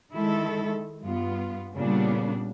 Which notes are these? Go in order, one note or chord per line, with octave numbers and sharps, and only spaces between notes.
D#3 G#3 E4 A4
G2 B3 F4
A#2 C#3 G3 B3 D4